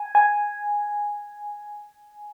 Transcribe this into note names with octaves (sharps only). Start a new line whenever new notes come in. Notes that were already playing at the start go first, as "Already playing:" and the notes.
Already playing: G#5
G#5